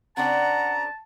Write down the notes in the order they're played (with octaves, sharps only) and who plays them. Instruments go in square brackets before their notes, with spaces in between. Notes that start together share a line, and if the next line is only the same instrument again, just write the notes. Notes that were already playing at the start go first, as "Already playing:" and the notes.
[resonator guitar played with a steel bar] C#3 C4 D4 [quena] F#5 [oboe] A5 [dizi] A#5